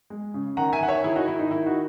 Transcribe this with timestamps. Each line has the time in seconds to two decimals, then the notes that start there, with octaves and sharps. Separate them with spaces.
0.10 G#3
0.34 C#3
0.57 D#3 F#5 A#5
0.73 E5 G#5
0.81 D#3 F#5
0.88 C#5 E5
1.04 D#3 E4 G#4
1.15 D#4 F#4
1.27 D#3 E4
1.39 D#4
1.51 D#3 E4
1.66 D#4 F#4